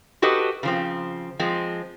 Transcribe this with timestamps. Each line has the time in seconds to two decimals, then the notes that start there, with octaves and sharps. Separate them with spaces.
0.22 F#4 G4 A4 B4 D#5
0.63 C#3 F3 C4
1.39 F3 G#3 C4